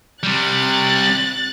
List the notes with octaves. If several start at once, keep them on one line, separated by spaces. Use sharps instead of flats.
C3 G3 F#6 A6